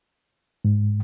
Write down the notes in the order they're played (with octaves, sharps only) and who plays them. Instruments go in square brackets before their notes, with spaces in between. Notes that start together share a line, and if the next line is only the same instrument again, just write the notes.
[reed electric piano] G#2